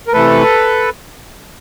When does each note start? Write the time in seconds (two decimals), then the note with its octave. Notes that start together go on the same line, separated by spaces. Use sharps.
0.07 A#4
0.13 C3 E3 A3 A4 B4